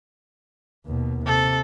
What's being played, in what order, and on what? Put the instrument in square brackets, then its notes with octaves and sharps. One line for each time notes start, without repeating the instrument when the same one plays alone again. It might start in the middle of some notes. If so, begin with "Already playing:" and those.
[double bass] D#2 B2
[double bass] C3 [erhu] A4